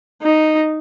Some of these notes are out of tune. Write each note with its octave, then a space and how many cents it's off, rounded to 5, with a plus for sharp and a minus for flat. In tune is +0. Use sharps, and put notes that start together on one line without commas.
D#4 -5